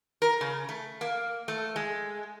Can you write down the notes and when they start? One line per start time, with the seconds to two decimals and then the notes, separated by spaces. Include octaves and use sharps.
0.22 A#4
0.41 C#3
0.69 A3
1.01 A#3
1.48 A3
1.76 G#3